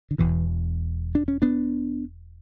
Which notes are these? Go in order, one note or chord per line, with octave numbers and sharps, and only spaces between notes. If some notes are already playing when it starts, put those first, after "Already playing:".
D3
E1 E2 B2 E3
D4
C#4
B3 D4